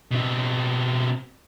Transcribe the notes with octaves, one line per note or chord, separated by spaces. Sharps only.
B2 C4